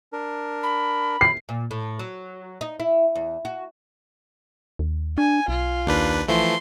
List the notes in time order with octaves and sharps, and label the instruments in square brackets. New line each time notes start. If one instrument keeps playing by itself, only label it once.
[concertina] D4 A#4
[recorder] B5
[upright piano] C7
[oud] A#2
A2
F#3
D#4
E4
E2
F#4
[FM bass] D#2
[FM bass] D4 [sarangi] G#5
[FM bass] B1 [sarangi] F4
[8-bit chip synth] D#2 D4 B4
[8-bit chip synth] E3 F3 A3 [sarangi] C6